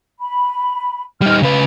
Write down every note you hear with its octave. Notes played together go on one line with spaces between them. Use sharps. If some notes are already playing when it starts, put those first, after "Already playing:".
B5
G3 D#4 F6
C#3 B4 F5